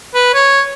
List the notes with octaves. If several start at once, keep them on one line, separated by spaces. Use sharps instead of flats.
B4
C#5